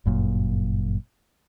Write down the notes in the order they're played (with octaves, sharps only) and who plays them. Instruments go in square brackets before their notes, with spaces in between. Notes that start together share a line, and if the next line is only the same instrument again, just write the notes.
[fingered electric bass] G1 F#2 A#2